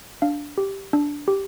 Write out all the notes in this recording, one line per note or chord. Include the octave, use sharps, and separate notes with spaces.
D4 F5
G4
D4
G4